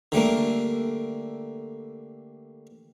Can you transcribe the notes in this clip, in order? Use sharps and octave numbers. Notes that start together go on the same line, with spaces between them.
D3 G3 A3 A#3